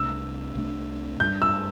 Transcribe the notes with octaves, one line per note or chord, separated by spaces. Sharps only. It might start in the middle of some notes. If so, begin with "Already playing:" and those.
Already playing: C2 C3 A3 D4 E6
C2 C3 A3 D4
G2 G3 D4 G6
E6